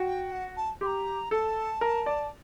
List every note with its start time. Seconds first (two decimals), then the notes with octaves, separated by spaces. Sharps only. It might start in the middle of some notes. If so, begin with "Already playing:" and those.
Already playing: F#4 G5
0.32 F#5
0.57 A5
0.81 G4 C6
0.86 A#5
1.31 A4 A5
1.81 A#4
2.06 D5